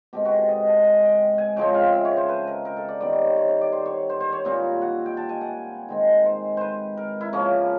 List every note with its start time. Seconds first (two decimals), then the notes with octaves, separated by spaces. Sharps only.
0.13 B2 G#3 C4 G4
0.25 F#4
0.36 A4
0.49 D#5
0.67 A5
0.84 G#5
1.03 G5
1.38 G#5
1.56 C#3 F3 G#3 C4 G5
1.74 F5
1.93 E5
2.05 C#5
2.17 C5
2.29 B4
2.47 A#4
2.65 A#4
2.77 A4
2.89 D5
3.01 D#3 G3 B3 D5
3.13 C#5
3.25 C5
3.37 C#5
3.49 C#5
3.61 D5
3.72 C5
3.86 C#5
4.10 C5
4.20 C5
4.32 C#5
4.45 A#2 G3 C4
4.82 F#5
5.06 G5
5.17 A5
5.29 G#5
5.41 F#5
5.89 D#3 G#3 C4
6.26 C5
6.57 B4 C5
6.97 A#4
7.21 E4
7.33 C#3 F3 A#3 C#4